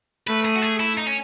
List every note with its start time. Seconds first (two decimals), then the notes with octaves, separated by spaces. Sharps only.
0.27 A3 B4
0.45 G#4
0.56 F#4
0.62 G#4
0.80 E4
0.98 D#4
1.07 C#4